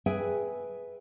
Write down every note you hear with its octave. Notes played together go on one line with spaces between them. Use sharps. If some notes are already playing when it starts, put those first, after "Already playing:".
G#4 B4 E5 G5 G#5